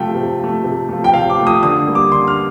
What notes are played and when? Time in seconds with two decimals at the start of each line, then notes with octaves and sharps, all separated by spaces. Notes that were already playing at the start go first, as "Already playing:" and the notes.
Already playing: C3 F3 A3 G5
0.15 C3
0.40 F3 A3
0.64 C3
0.89 F3 A3
1.04 G5
1.13 C3 F5
1.30 D6
1.38 F3 A3
1.47 D#6
1.62 D3 D#6
1.87 G3 A#3
1.95 D6
2.12 D3 C6
2.28 F6